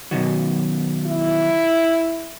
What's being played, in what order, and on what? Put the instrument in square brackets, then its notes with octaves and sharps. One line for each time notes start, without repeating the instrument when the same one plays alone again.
[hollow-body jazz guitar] B2 D#3 F#3
[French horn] E4